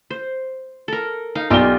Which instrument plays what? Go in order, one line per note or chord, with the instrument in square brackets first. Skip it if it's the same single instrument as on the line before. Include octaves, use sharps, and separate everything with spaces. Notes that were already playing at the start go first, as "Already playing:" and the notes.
[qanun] C5
A4 A#4
D#4 F5
[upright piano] B1 D5 G7 [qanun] D#4 F4 G4